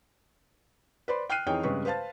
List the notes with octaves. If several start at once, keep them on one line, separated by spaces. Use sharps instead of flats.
B4 C5 D5 B5 C6
G5 F6 F#6 C7 D#7
F2 E3 D#4 G#4 C#5 G5
G2 C#3 G#3 C4 B4 C#6
B4 C5 F5 A5 A6